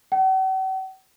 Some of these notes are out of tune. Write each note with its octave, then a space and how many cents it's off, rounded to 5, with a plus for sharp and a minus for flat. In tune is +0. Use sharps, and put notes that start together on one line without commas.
F#5 +45